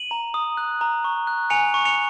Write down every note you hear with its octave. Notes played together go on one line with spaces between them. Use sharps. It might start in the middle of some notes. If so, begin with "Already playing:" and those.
Already playing: D#7 F#7
A#5
D#6
F#6
A#5
C#6
F#6
G#5 C#7 F7
C#6
C#7 F7